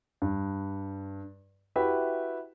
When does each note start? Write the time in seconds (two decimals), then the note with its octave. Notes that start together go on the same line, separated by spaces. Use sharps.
0.22 G2
1.76 E4 F#4 G4 B4 E5